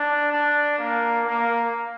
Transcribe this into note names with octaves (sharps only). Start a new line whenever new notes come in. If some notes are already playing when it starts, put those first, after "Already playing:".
Already playing: D4
D4
A#3
A#3